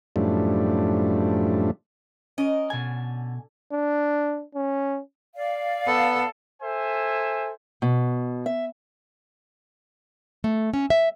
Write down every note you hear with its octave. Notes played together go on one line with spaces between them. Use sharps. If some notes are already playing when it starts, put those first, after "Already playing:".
F#2 A2 F3 G3 A3 D4
C#4 A#4 D#5
B2 D3 G#5
D4
C#4
D5 F5
B3 A4
A4 C5 E5 G#5
B2
E5
A3
C#4
E5